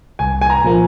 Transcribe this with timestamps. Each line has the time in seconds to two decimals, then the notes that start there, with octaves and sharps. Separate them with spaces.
0.19 C2 G#5
0.41 G#5
0.50 A#5
0.65 A#2 F3 A#3